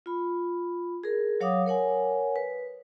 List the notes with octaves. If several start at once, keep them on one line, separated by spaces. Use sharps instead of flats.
F4 B5
G#4 A#4
F#3 C#5 F5 F#5 D6 D#6
A#4 C#5 F#5 G#5
B4